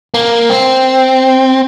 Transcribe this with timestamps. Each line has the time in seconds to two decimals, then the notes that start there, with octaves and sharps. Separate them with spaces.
0.14 A#3
0.50 C4